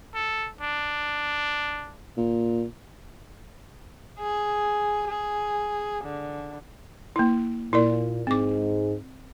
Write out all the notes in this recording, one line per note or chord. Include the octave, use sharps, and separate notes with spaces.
A4
D4
A#2
G#4
G#4
D3
A#3 E4
A#2 E4 A#4 D5
G#2 G#3 C4 D6